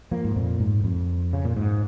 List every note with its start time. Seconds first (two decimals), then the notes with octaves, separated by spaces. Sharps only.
0.11 F3 A#3
0.24 G#2
0.36 F2 A#2
0.60 G#2
0.84 F2
1.33 C#3
1.45 A#2
1.56 G#2